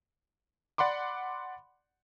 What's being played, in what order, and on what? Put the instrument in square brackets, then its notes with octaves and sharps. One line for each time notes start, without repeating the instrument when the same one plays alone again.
[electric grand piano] D5 F#5 B5 C6 D6